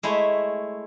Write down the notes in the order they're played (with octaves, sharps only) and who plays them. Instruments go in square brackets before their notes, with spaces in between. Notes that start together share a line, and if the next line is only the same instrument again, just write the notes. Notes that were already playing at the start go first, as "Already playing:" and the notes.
[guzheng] G#3 A3 E4 C#5 E5